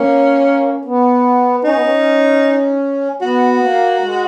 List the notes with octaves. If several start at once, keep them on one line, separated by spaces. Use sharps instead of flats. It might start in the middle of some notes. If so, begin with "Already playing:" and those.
Already playing: A#3 C#4
B3
C#4 D#4
B3
C#4
B3 F#4
A#3
G#3